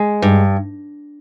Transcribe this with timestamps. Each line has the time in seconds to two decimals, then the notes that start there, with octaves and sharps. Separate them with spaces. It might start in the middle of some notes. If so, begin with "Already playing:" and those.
Already playing: G#3
0.22 G2